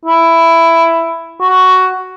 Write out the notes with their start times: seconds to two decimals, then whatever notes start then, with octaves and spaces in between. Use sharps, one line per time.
0.05 E4
1.41 F#4